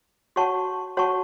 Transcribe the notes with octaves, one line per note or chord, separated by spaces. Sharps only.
F#4 C#5 F#5 A5 C#6
F#4 C#5 F#5 A5 C#6